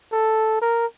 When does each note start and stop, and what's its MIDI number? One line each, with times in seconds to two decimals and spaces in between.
0.13 0.60 69
0.61 0.86 70